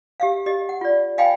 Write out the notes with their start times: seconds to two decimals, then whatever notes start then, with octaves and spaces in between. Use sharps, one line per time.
0.20 G4 E5 F5
0.46 G4 D#5
0.69 F#5
0.81 F4 D5
1.18 D#5 F5 G5 G#5 B5